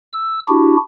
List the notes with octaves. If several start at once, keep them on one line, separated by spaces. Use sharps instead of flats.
E6
D4 E4 F#4 G4